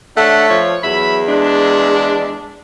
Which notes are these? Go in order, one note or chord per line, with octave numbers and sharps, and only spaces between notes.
A3 D4 C#5 F#5
F3 C#5
E2 F#3 E5 B5
G#3 D4